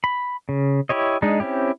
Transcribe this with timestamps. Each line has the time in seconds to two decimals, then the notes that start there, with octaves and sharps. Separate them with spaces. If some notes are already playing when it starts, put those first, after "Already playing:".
0.04 B5
0.49 C#3
0.89 E4 G4 C#5 D#5
1.22 G#3 D4 D#4
1.40 C4 C#4 E4 G4